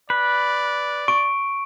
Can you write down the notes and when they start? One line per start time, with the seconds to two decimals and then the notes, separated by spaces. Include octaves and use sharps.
0.10 B4 D5
1.08 C#6 D7